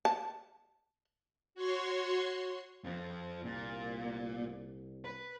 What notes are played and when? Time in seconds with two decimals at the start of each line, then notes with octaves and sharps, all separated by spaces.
0.05 A5
1.55 F#4 C#5 C6 C#6
2.84 F2 F3 C4
3.44 C2 A#2
5.05 B4